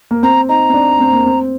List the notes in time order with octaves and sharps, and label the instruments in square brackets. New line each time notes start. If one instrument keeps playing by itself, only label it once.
[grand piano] A#3
[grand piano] C4 [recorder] A#5
[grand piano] D#4 [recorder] A#5
[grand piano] C4
D4
C4
A#3
C4